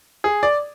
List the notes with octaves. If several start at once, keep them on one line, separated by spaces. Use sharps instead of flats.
G#4
D5